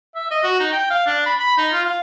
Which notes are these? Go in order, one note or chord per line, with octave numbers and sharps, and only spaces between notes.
E5
D#5
F#4
D#4
G5
F5
D4
B5
B5
D#4
F4
F5